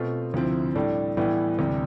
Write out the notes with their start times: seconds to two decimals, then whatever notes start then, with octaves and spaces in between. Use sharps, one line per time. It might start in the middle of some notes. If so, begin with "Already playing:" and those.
Already playing: B2 A3 C4 F4
0.34 D2 C3 F3 C4 E4
0.75 A2 G3 D4 A4
1.17 A2 E3 G3 B3 E4
1.59 D2 C3 E3 G3